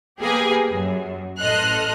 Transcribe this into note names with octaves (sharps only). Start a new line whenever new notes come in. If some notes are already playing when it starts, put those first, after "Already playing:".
A#3 G4 G#4 B4 G#5
F#2
A1 A4 D#5 C6 F6 F#6